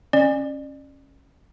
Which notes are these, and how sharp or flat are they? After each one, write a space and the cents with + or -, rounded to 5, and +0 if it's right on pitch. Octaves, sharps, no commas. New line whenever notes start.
C#4 -20 D5 +35